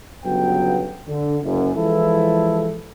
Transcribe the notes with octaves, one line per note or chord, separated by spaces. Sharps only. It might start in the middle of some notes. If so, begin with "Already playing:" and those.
G1 C#3 F#3 B3 G5
D3
F#1 F#2
E3 F3 G#3 E4 A4